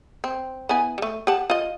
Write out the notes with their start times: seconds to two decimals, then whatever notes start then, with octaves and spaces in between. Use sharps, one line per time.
0.24 C4
0.69 B3 E4 G#5
0.98 G3 A3
1.27 G4 F#5 A5
1.50 F4 D#5